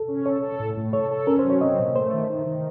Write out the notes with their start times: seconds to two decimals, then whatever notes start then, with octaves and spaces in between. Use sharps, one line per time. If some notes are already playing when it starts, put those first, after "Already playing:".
Already playing: A4
0.08 C#4
0.26 A4 C#5
0.42 A4
0.59 A2
0.77 A2
0.93 A4 C#5
1.11 A4
1.27 C#4 A#4
1.39 C5
1.44 F#3
1.50 C#5
1.61 C4 D#5
1.79 A#2
1.96 A3 C5
2.13 D#3
2.29 D#3
2.46 D#3